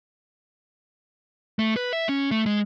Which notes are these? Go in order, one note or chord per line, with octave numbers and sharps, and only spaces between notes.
A3
B4
E5
C#4
A3
G#3